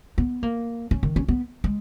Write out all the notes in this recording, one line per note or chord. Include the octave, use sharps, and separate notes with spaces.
B3
A#3
C#4
D#3
C#4
B3
G#3